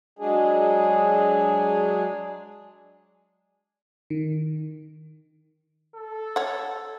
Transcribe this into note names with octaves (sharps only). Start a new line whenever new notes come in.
F#3 G#3 D4 G#4
D#3
A4
C#5 F#5